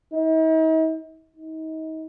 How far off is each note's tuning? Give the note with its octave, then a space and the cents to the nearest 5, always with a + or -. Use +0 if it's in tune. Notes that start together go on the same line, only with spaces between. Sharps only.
D#4 +45
D#4 +35